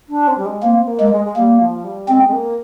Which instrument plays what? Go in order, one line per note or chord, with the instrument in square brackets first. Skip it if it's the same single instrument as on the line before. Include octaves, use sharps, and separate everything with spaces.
[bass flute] D4
C4
G3
G#3
[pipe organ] A#3 [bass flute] C4
[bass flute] A#3
[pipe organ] G#3
[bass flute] G#3
G#3
[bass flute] G3 [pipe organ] A#3
[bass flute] F3
G3
[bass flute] G#3 [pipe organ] C4
[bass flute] G#3
A#3